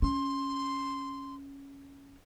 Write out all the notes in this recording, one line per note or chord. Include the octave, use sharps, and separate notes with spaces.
C#4 C6